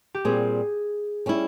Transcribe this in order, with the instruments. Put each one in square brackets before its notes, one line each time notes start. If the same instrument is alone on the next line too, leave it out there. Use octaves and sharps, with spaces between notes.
[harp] G4
[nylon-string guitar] A#2 G3 C4 [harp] G#4
[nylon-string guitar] G3 C#4 E4